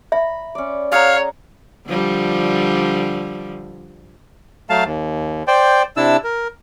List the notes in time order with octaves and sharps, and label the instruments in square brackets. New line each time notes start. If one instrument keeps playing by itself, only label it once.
[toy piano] E5 [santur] B5
[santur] C#4 D5
[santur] G#4 F#5 A#5 [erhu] C#5 [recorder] F5
[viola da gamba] D3 F3 G3
[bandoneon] F#3 A3 F5 A5
D#2
C5 D5 G5
C3 D4 E4 A5 E6
A#4